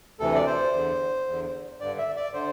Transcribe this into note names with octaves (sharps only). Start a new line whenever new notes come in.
D2 C3 E3 A4
D5
C5
E2 D3
E2 D3
G2 D3 D5
E5
D5
D3 C5